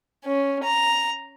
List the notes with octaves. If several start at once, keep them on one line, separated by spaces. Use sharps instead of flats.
C#4
A#5